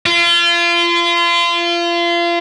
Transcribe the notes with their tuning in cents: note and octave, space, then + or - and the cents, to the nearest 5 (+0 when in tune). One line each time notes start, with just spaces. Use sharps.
F4 -30